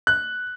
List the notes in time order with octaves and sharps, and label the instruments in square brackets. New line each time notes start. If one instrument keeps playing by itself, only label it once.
[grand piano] F#6